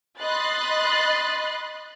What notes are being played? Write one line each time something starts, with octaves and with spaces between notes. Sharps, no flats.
D#5 B5 C6 F#6 A6